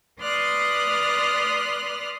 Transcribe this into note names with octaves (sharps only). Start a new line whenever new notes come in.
B4 D5 C6 D#6 F6 F#6